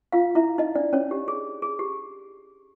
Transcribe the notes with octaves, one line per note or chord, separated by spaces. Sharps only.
F4 F5
E4 E5
D#4 D#5
D4 D5
C#4 C#5
G4
G#4
G#4
G4